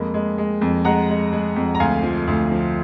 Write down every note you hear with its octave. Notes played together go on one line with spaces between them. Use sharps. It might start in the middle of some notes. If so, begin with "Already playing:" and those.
Already playing: F2 G#3 A#3 B5
G#3
G#3
F2
G#3 F#5 A#5
G#3
G#3
F2
A#5
D2 F5 G#5
F3
D2
F3